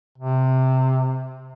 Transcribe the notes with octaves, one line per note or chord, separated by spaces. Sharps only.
C3